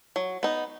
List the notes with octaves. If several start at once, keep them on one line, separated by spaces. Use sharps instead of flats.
F#3
B3 D#4